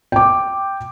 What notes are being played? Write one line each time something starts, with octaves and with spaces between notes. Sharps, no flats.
G5 D6